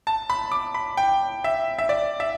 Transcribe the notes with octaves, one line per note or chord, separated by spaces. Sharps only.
A5
B5
D6
B5
G5
E5
E5
D5
E5